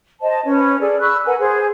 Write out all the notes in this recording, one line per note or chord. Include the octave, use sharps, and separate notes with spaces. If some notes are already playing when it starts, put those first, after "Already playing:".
C5 D#5 A5
C#4 B4 C#5
G#4 A4 D5
B5 C#6 E6 F#6
A#4 B4 F#5 G#5
G#4 C5